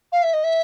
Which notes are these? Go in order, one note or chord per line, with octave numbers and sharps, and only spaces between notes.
F5
E5
D#5
E5